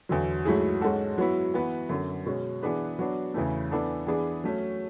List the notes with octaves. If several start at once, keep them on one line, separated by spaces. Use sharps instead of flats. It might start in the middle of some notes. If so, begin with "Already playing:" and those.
E2 D3 F#3
G#2 F#3 A3 E4 G#4
G#2 G#3 C#4 F#4 A4
F#3 B3 E4
E3 B3 F#4 B4
F#2 D3 F#3
B2 G#3 C#4
E3 B3 D4 G#4 B4
F#3 B3 D4
E2 C#3 E3 A3
E3 B3 D4 A4
E3 B3 D4 G#4
F#3 A3 C#4